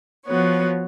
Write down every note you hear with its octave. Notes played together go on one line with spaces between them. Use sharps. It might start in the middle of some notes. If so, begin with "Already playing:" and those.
F3 B3 F#4 C#5